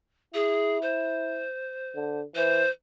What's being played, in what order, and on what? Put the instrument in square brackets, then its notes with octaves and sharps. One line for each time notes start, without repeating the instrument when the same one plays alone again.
[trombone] E4 [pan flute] G#4
[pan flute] C5
[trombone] D3
[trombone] E3 [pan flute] C5